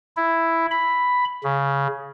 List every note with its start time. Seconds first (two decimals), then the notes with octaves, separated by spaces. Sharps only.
0.17 E4
0.71 B5
1.44 C#3